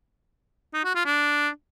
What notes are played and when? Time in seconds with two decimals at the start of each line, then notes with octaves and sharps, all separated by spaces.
0.74 D#4
0.84 F#4
0.95 F4
1.05 D4